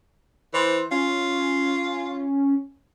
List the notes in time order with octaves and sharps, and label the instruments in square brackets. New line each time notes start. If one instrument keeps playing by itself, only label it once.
[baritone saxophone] E3 [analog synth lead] C5
[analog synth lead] C#4 [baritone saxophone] F4